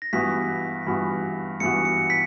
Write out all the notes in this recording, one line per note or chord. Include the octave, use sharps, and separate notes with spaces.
A#6
G2 E3 B3 F#4 B6
G2 E3 B3 F#4
G2 E3 B3 F#4 C#7
C#7
B6